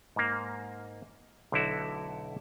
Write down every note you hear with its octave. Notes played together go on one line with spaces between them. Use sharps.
G#2 A#3
B1 D3 A3 E4 F#4